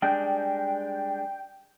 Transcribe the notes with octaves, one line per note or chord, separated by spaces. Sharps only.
G3 G#3 D4 G5